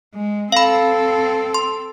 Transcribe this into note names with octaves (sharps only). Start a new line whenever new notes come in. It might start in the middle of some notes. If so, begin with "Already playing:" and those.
G#3
C4 A4 F5 B5
C6